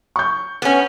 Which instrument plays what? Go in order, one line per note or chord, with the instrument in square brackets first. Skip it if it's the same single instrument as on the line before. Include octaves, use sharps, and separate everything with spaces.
[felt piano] C#6 G6
[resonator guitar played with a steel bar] B3 C#4